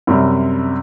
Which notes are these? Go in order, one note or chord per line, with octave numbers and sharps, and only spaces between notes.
F#2 C3 G3